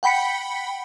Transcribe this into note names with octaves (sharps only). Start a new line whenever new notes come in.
F#5 G5 B5 B6 C#7